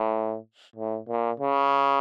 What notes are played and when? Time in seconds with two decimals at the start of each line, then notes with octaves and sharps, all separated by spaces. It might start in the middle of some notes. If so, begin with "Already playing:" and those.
Already playing: A2
0.76 A2
1.09 A#2
1.40 C#3